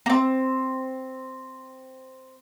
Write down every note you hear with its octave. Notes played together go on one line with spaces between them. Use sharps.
A#3 C4